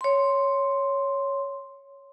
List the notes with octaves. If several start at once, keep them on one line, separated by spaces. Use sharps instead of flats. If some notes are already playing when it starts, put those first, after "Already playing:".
C#5 C6